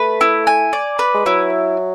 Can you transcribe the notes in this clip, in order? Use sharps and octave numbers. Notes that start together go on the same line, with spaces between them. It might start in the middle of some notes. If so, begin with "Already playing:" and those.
Already playing: A3 B4
E4
G#5
D5
B4
G#3
F#3 E4